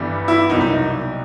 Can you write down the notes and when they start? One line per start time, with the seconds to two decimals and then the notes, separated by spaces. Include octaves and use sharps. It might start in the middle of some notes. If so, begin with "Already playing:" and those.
Already playing: G1 G2 E3 G3 B3
0.28 E4
0.49 C2 B2 F#3 A#3 D#4
0.61 D#4